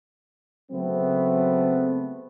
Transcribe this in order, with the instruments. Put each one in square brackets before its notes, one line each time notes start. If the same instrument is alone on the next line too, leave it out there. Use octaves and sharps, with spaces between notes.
[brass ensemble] C#3 F#3 A3 B3 C4